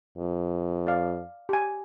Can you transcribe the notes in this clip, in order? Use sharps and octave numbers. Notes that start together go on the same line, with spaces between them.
F2
D5 F5
G4 G#5